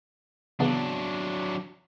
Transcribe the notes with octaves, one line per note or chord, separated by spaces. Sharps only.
C#3 E3 F#3 B3 D4